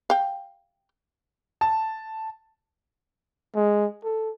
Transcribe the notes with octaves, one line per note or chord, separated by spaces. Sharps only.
F5 G5
A5
G#3
A4